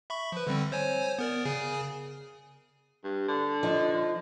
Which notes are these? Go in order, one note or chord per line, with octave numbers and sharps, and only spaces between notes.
E5 B5 C#6
F3 B4
D3 G3 C4
C5 C#5 G#5
B3 A#4 D5
C#3 G#4 G#5
G2
D3
F3 D#4